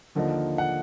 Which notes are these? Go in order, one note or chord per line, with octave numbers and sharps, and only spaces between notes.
D#2 D3 F3 A#3 D#4
F#5